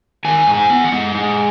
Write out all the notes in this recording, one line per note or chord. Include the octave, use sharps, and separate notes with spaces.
D#3 G#5
G#2
G#5
B3
F#5
G#3
G#3